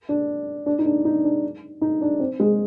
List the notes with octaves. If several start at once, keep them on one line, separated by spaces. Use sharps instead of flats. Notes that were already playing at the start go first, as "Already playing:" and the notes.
D4
D4
D#4
D4
D#4
D4
D#4
D4
C4
G#3